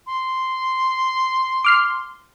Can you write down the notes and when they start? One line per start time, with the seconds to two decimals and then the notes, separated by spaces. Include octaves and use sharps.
0.07 C6
1.65 D6 F6 C7